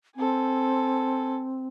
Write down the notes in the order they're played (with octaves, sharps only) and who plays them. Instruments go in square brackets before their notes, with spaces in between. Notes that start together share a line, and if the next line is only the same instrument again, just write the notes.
[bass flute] C4 [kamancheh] A4 G#5